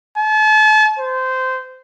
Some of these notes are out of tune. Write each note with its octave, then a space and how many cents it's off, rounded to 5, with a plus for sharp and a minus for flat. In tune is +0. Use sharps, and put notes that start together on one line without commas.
A5 -40
C5 -15